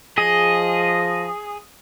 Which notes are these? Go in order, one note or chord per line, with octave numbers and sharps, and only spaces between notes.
F3 G#4 D#5